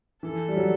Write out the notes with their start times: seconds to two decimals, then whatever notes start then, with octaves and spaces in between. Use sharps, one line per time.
0.23 E3 A4
0.48 G3
0.57 F#3